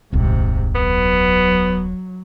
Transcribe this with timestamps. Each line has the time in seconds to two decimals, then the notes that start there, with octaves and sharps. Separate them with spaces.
0.13 D#1 C2 G#2 C3
0.75 F#3 B3